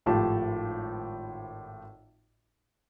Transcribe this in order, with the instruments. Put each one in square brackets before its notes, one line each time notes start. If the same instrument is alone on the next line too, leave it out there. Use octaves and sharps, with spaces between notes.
[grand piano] G#1 A2 F3 F4 G4 A5